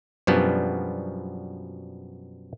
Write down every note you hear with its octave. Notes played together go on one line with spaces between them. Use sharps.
F#2 B2 F3 G3 B3 D4